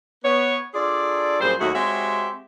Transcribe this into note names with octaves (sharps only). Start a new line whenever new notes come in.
B3 C#5
D4 F4 G#4 A4 D5
F#2 A#2 G3 G#4 C5
D#2 F#3 A3 F#4
G#3 C4 F#4 G4 C#5 E5